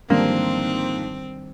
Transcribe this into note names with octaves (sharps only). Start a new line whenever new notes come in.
G#2 D3 D#3 F3 G3 A#3 C4 D4